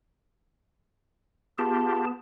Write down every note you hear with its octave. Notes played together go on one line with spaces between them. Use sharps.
B3 F4 G4 G#4 A5